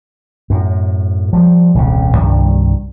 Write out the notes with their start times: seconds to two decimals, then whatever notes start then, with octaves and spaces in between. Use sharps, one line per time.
0.50 F#2 A2
1.33 F3 G3
1.75 D#1 C2 C#3
2.17 C2 G2 D#3 G3